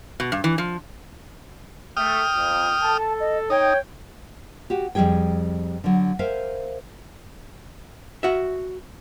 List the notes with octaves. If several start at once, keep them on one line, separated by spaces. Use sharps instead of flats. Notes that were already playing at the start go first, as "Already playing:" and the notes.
B2
G2
E3
F3
A3 G5 D#6 F6
F2
A4 A5
D#5
D#4 C#5 G5
F#4 G4
F2 C3 G3 G#4 G5
D3 F#3
A#4 C5 E5 F5 G#5
F#4 E5